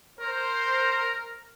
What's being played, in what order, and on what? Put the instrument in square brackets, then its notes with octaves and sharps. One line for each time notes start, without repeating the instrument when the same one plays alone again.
[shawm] A#4 [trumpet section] C5